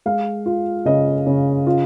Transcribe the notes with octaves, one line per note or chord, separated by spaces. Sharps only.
G#3 F5
F4
C#3 D#5
C#3
F4